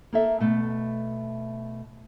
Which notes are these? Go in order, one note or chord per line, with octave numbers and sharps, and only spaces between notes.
A#3 A4 E5
B2 A3